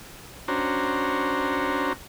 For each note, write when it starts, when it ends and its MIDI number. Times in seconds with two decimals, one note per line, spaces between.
0.48 1.93 61
0.48 1.93 62
0.48 1.93 66
0.48 1.93 72
0.48 1.93 82